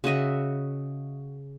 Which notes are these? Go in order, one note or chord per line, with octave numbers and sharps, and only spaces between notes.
C#3 F#4 D#5 E5